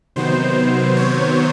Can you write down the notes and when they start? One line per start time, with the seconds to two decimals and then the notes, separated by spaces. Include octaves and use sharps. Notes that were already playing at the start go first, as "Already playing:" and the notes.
0.16 C3 D#3 F#3 B3 C5
0.96 C#5